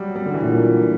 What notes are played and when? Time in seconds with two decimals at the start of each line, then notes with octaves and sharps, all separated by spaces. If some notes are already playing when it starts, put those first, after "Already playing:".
Already playing: F#3 G3
0.16 G3
0.26 D3
0.34 E3
0.42 A#2 F#3